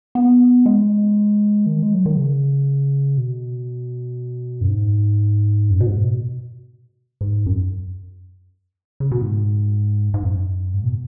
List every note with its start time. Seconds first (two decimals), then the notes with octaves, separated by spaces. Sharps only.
0.15 B3
0.66 G#3
1.66 D#3
1.83 G#3
1.94 F#3
2.06 D#3
2.17 C#3
3.17 B2
4.61 F#2
4.69 G#2
5.70 F#2
5.80 B2
5.86 G#2
6.03 B2
7.21 G#2
7.46 F#2
9.00 C#3
9.12 B2
9.22 G#2
10.14 G#2
10.23 F#2
10.74 G#2
10.84 B2